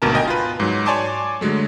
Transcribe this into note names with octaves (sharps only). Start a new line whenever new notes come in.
G#1 D2 B2 A#4 A5
A#4 D#5 G5 G#5
F4 B4
G#2 F#3
C#5 D5 G#5 A5 C6 D6
D3 F#3 G#3 A3